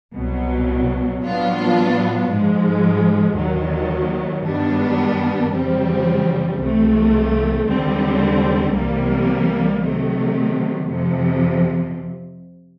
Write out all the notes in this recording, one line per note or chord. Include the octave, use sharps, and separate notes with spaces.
C2 B2 F#3
A2 F#3 B3 D4 F4
G#2 F3 G#3
D#2 D#3 F#3
G2 D#3 G3 B3 D4
F2 C#3 E3 G3 C4
C2 C3 E3 A3
D#2 D3 G3 C4
C2 C3 E3 G3 A#3
C3 D#3 F#3 A3
F2 C3 F3